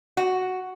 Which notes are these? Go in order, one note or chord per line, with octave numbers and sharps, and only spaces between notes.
F#4